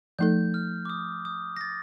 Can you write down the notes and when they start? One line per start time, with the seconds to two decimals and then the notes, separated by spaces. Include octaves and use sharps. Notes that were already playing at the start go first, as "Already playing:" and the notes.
0.19 F3 A3 D#4 A4 G6
0.54 F6
0.85 D6
0.90 D#6
1.25 D#6
1.57 A#6
1.61 A6